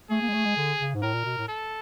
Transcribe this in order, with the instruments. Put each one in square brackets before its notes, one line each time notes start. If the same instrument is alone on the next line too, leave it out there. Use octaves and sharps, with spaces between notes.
[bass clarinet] A3 [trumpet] G#4
[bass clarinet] A#3
G#3
A3
G#3
D3
C#3
G#2
[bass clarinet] A2 [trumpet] A#4
[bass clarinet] A#2
B2
A2
[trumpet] A4